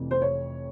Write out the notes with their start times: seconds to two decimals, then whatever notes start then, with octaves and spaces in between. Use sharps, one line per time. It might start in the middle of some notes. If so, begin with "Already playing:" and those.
Already playing: F1 F2 C3 E3
0.11 C5
0.22 C#5